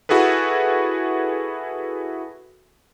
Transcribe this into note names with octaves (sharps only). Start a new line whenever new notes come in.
E4 F#4 G#4 A4 B4